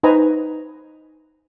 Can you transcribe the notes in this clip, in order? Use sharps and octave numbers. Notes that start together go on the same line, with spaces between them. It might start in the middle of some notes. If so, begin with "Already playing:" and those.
D#4 B4 C5 D#5 G#5 A#5